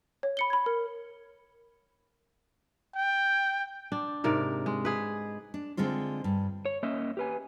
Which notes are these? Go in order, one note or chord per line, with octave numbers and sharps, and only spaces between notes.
C#5
B5 C#7 G7
B5 G#6
A#4
G5
D4
G#2 C3 A#4 D5
G#3
G#4 B4
D4
D3 G#3 C4 F4 C5
G2
C#5
A#3 C#4 D#5 E5
G4 B4 G#5